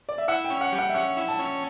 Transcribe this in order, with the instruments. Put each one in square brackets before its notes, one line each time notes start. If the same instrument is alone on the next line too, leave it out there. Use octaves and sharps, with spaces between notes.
[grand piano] D5
E5
[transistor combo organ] E4 [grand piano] F#5
[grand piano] G5
[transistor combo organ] C#4
[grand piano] F#5
[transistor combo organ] G3
[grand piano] F#5
E5
[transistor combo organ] C#4 [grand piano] F#5
[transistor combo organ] E4
[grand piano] A5
[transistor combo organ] C#4